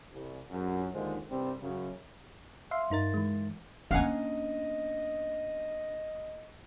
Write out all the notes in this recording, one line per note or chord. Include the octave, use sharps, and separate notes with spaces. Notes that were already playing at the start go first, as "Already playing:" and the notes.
C2
A#1 F#2
D#2 D3 D#3 G#3 F4 C5
C2 G2 C3 G3 C4 G4
F#2 C#3
E5 F5 C6
G2 D#4 A#4 A6
E3 G#3
A#3 B3 C#4 D4 D#5 F5 F#5 G#5